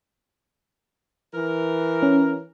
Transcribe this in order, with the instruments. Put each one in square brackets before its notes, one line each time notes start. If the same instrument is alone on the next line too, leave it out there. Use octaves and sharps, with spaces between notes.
[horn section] E3 A#4
[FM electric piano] C#4